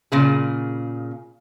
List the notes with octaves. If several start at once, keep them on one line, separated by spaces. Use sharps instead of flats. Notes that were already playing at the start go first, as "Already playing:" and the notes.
A#2 C#3 G#4